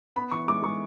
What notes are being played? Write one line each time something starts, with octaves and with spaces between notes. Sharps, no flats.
B3 B5
E3 C#6
G#3 D6
G#3 C#6